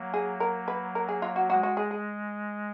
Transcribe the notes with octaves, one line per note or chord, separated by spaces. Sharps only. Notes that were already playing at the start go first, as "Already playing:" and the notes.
Already playing: F#3 A#3
G#4
A#4
B4
A#4
G#4
F4
F#4
G#3 F#4
F#4
G#4
G#4